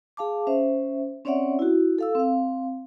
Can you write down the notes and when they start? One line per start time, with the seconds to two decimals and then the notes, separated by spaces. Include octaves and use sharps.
0.17 G#4 F5 A5 D6
0.47 C#4 C5 E5
1.25 C4 C#4 C#5 D5 E5 F#5
1.59 E4 F#4
1.98 A4 F5 E6
2.15 C4 F5